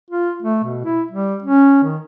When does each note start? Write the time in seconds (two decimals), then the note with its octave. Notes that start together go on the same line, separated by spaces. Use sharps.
0.10 F4
0.43 A3
0.64 B2
0.85 E4
1.11 G3
1.43 C#4
1.84 D#3